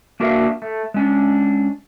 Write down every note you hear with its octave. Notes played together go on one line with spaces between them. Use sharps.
A#3 D4 F#4 A#4 E5 F5
A3
G#3 C#4 D4